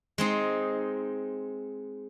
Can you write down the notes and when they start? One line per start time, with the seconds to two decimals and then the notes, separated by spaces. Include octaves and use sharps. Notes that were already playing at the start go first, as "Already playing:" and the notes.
0.18 G#3 C4 D#4